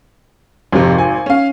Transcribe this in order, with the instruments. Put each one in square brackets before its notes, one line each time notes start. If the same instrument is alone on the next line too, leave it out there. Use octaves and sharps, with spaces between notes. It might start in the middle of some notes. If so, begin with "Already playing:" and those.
[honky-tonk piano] G#1 [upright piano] F2 C3
[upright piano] G#5
[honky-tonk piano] C#4 F5